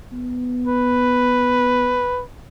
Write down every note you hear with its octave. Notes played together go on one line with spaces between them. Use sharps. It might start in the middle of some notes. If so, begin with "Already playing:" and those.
B3
B4